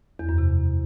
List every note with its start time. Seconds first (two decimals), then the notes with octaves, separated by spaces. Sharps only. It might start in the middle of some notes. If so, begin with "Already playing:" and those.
0.19 E2
0.29 F#2
0.38 C3